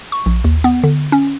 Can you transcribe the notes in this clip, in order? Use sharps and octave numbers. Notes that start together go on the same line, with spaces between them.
C#6
A#1
D#2
B3
D3
C#4